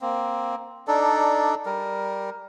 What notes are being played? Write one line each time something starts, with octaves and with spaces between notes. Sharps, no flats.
A#3 C4
D4 D#4 A4 D5
G3 A#4